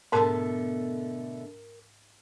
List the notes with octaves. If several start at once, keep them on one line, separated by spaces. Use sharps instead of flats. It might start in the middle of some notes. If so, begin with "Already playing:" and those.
G#2 B2 D3 A3 A#4 A5